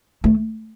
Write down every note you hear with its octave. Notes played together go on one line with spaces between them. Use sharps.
A3